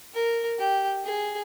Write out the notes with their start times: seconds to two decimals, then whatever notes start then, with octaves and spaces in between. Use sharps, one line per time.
0.14 A#4
0.59 G4
1.05 G#4